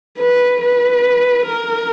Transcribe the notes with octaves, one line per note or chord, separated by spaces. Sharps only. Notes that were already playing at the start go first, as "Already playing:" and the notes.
B4
B4
A#4